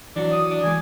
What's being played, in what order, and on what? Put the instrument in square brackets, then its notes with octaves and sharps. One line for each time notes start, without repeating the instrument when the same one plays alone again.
[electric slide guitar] E3 F#3 F#4 [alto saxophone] D4
[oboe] D#6
[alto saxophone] D4
[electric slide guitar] E3 G#3 [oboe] G#5